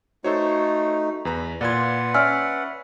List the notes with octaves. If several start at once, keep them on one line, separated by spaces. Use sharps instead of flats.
A3 D#4 F#4 A4 C5 C#5
E2 B4 A#5
A#2 F4 B4 D5 F#5 C6 G#6
C#4 D5 E5 G#5 C#6 E6 F6